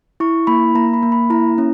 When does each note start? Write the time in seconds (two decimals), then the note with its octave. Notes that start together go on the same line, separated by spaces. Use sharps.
0.20 E4 C#6
0.47 A#3 B5
0.75 A#3 A#5
0.93 B5
1.03 A#3
1.12 B5
1.30 E4 A#5
1.58 C#4